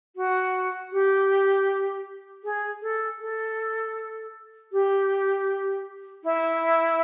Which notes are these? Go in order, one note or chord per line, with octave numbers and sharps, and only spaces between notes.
F#4
G4
G#4
A4
A4
G4
E4